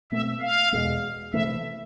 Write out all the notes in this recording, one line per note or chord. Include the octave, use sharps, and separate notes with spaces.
B2 A3 C4 E5
F5
E2 B2 G#3
C3 E3 A3 E5